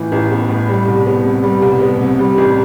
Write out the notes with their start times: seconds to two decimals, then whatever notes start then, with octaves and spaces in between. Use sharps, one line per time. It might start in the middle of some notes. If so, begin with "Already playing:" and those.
Already playing: A1 A2 E3 B3
0.12 A1
0.30 B3
0.49 A2
0.69 G3
0.88 C2
1.06 B3
1.25 C3
1.43 G3
1.62 C2
1.82 B3
2.01 C3
2.19 G3
2.38 A1